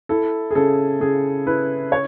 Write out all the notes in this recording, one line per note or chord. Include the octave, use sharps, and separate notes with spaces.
E4 A4
G#4
C#3 A4
C#3 G#4
E4 B4
C#5